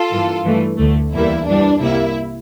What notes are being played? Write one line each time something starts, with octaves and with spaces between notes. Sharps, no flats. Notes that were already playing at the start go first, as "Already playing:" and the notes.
Already playing: F4 A4
G2 E3 A#3
G2 E3 A3
D2 D3 A3
E2 E3 G3 A#3 E4
G2 E3 G3 D4
C2 C3 G3 A#3 E4